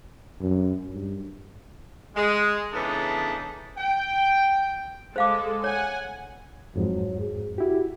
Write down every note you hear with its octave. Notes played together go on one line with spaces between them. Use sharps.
F#2
G2
G#3
C#3 E3 B3 D4 D#4 A4
G5
G#3 A4 C5 F5 D6
C#5 F#5 G#5
F2 G#2 F#3
G#4
E4 F#4 G4